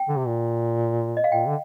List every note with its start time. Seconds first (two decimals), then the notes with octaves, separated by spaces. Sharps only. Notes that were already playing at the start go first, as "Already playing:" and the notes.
Already playing: G5
0.08 D3
0.18 C3
0.27 A#2
1.17 D#5
1.24 F5
1.32 A#2 G5
1.47 D3